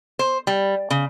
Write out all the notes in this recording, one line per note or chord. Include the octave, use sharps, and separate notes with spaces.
C5
G3
C#3